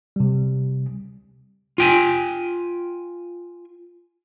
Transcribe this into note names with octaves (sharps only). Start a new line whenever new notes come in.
C3 G3
F4 G5 G#5